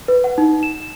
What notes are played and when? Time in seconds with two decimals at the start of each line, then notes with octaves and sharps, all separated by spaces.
0.08 B4
0.24 F#5
0.38 D#4
0.63 E7